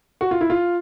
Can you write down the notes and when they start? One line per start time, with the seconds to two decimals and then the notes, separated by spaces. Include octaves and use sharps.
0.21 F#4
0.31 F4
0.41 E4
0.50 F4